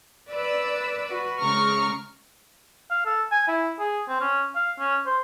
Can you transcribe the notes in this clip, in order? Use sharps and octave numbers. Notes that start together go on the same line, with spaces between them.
B4 D5 E6
F#4 B4
C#3 G#3 A#5 C#6 F6
F5
A4
G#5
E4
G#4
C4
C#4
F5
C#4
C5